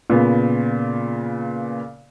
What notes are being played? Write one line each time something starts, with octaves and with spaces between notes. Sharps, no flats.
A#2 C#3 B3